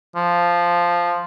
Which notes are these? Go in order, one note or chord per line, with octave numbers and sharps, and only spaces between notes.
F3